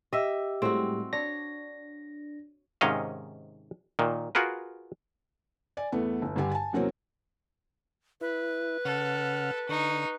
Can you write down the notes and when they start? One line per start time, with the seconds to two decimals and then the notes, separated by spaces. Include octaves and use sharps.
0.13 G4 D#5 E5
0.62 A2 G3 G#3 C4 F#4
1.13 D4 C#5 A#6
2.81 G#2 C3 D#3 C#4 D#5 F5
3.99 A#2 D#3
4.35 F4 F#4 G#4 A#4 B4
5.77 D5 G#5
5.92 E2 A3 B3
6.22 G1
6.36 G2 D3 G4 G#5
6.51 G#5 A5
6.73 E2 C3 F#3 A#3 C4 C#4
8.21 E4 B4
8.85 C#3 A4 F#5 F6
9.69 D3 D#4 C#6